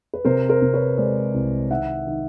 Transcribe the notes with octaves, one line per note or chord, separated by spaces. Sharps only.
B4
C3 A#4 C5
A#4 C5
C3
B4 C#5
G#3 C5 D5
C2
D#3 E5 F#5
D#3